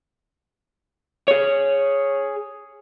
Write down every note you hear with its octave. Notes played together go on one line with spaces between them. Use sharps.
G#4 C#5